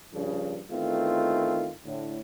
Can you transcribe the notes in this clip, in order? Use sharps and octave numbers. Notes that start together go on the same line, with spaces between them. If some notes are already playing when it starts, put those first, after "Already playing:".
A#1 G2 C#3 F3
E2 D#3 A3 C4 F4
A2 D3